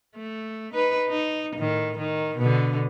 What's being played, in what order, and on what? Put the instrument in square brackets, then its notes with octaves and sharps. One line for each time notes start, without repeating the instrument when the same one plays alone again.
[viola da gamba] A3
D#4 B4
D#4
A2 D#3
D#3
B2 D3